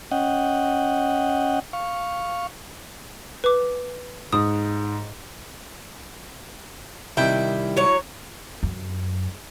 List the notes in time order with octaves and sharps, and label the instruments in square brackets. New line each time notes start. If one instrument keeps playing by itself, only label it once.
[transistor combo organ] C#4 D#5 F#5 G5
F5 C#6
[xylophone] B4 D6
[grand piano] G#2 [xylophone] D#6
[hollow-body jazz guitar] C3 D#3 G3 [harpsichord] E4 [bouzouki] G5
[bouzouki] F#3 C#5
[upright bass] F#2